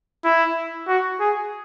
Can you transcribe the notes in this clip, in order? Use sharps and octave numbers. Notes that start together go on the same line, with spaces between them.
E4
F#4
G#4